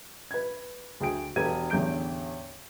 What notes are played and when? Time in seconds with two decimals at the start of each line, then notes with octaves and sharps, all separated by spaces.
0.31 B4 G#6
1.00 D2 G#4 G5 D7
1.36 E1 G4 A4 B4 G#6 D#7
1.70 A1 E2 D3 G6 D7